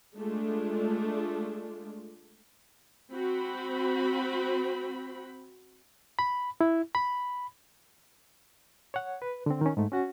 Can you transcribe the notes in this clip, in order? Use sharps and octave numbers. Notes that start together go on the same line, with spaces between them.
G#3 A3 D4 F4
C4 F#4 B5
B5
E4
B5
C#5 F#5
B4
D3 C4
D#3 C#4
G#2 A3
C#4 F#4 F#5